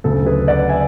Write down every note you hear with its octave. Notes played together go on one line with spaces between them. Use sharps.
D2 C#3 F#3 A4
G#4 B4
D5 F#5
E5 G#5